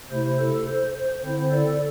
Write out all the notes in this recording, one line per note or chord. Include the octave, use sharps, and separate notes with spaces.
C3 A3 E4 C5
A4
C5
C5
D3 C4 E4 C5
A4 D5